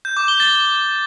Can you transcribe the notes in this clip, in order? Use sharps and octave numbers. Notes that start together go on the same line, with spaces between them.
G6
D6
G7
A6